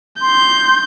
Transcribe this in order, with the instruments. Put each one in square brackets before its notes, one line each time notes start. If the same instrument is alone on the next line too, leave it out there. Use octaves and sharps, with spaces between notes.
[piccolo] C6 [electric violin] G6